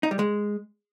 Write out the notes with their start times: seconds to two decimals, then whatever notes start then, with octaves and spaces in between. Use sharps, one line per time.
0.03 D#4
0.11 G3
0.19 G#3